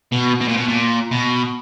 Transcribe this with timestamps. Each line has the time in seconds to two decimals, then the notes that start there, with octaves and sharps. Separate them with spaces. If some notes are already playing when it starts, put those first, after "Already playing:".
0.12 B2
0.41 B2
0.48 A#2
0.57 B2
0.68 A#2
1.11 B2